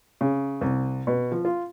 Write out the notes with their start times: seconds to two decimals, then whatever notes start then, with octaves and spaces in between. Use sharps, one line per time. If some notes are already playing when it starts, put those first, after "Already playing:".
0.21 C#3
0.61 C2
1.07 B2
1.32 F3
1.45 F4